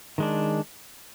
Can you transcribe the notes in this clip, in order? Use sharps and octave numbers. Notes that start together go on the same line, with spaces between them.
D#3 G#3 D4